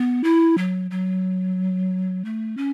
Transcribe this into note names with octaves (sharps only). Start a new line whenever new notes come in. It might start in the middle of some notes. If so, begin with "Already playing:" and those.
Already playing: B3
E4
F#3
F#3
A3
C#4